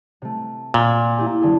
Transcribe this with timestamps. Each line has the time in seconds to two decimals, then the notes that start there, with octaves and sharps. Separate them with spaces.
0.22 C3 A3
0.74 A#2
1.17 E4 G4 G#5
1.41 F#1 D3 G#4